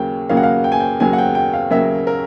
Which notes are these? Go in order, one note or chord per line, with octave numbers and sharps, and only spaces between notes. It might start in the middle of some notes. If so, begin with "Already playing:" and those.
Already playing: D#2 C#3 F#3 A#3 G5
D#2 C#3 F#3 A#3 F5
F#5
F5
G5
G#5
G5
D#2 C#3 F#3 A#3 G#5
F#5
G5
G5
F5
D#2 C#3 F#3 A#3 E5
A#4